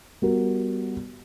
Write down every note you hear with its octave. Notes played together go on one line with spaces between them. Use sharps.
G3 B3 F#4 A#4